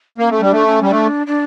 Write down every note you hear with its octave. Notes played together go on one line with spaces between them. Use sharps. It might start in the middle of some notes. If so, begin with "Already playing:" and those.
A#3 C#4
A3
G3 D4
A3
C#4
G3
A3 D4
D4